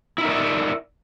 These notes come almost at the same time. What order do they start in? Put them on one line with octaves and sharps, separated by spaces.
E4 D#4 A#4 D5 E5